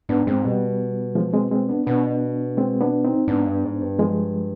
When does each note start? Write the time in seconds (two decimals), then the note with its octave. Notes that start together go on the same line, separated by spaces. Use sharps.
0.09 G#2 B3 D4
0.27 G#2 G#3 C4
0.45 B2 G3 B3
1.15 F3 G#3
1.33 G#3 C4
1.51 G#3 C4
1.69 B3 D4
1.87 B2 B3 D4
2.58 G#3 C4
2.81 B3 D4
3.04 C4 D#4
3.28 G#2 B3 D4
3.46 G2
3.64 G#2
3.81 G2
3.99 F3 G#3